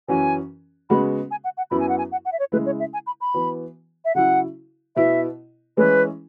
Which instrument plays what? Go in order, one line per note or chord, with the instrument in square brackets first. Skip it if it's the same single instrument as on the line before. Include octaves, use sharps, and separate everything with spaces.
[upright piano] F#2 E3 C#4 F#4 [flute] G#5
[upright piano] C#3 G#3 B3 F#4 [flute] B5
[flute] G#5
F#5
F#5
[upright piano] F#2 F#3 B3 E4 [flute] B5
[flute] G#5
F#5
G#5
F#5
F#5
E5
C#5
[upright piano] C#3 G#3 E4 [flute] B4
[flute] C#5
E5
G#5
B5
B5
[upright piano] E3 B3 F#4
[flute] E5
[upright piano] C#3 F#3 E4 [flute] F#5
[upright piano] B2 B3 E4 [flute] E5
[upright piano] E3 G#3 C#4 E4 [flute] B4